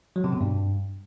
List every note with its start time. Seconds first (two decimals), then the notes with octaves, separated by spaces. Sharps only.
0.16 F#3
0.24 C3
0.32 B2
0.41 G2